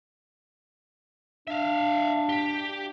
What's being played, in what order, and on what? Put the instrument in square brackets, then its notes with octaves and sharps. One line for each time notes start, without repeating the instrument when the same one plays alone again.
[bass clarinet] D4 [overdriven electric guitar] E5 F5
[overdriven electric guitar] G4